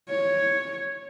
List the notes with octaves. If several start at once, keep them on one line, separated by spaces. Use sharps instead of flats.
C#5